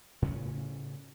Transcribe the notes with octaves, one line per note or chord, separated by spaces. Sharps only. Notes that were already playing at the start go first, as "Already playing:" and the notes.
A2 C#3 C#4